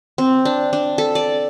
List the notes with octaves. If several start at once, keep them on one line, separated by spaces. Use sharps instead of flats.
C4
D4
D4
A4
D5